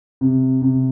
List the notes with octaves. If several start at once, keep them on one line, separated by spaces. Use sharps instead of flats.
C3
C3